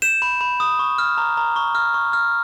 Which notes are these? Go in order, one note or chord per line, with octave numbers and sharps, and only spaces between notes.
G6 E7
B5
B5
D#6
C#6
F6
A#5
A#5
C#6
F6
C#6
F6